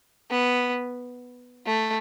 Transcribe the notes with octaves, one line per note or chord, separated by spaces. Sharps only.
B3
A3